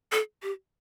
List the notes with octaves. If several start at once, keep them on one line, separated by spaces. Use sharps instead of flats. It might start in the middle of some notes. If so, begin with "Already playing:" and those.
A4
G4